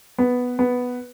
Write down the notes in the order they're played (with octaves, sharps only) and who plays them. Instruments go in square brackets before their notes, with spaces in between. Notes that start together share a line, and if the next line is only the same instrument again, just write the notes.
[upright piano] B3
B3